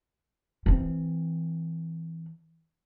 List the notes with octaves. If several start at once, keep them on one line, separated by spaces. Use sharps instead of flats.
E3 C4